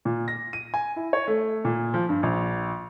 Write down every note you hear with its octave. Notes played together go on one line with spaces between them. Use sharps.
A#2
A#6
D#7
G#5
E4
C#5
A3
A#2
F3
G2
A#1